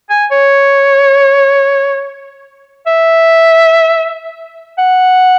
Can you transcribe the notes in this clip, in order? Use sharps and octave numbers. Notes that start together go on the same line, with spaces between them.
G#5
C#5
E5
F#5